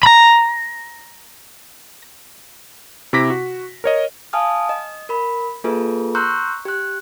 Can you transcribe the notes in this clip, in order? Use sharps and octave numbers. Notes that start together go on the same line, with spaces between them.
A#5 B5
C3 E4 D6 A#6 B6
F#4
A#4 C#5 D#5
F5 G#5 A5 D#6 F6
D#5
A#4 B5
A#3 F4 G#4 A4 B4
A#5 C6 C#6 E6 F#6 G6
G4 F#6